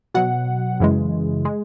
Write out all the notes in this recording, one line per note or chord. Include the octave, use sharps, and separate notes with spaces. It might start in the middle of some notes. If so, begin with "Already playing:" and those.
B2 F#3 F#5
F#2 C#3 E3 G#3
G#3